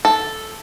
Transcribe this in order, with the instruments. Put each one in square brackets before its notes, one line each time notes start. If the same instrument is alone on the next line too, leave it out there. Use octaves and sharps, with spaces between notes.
[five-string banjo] A4